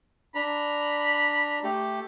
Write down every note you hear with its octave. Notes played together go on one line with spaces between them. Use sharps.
D4 A#5 B5
A3 G4